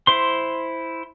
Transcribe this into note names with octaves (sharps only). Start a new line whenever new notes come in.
E4 C5 C6